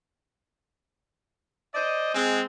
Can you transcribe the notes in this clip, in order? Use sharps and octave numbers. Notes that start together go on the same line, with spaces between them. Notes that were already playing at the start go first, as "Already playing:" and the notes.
C5 D5 D#5
G#3 C4